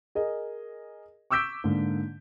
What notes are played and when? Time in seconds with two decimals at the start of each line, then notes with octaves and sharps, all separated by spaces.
0.15 G#4 A#4 D#5
1.30 C#6 D6 E6 G6 B6 D7
1.64 G#2 D3 A#3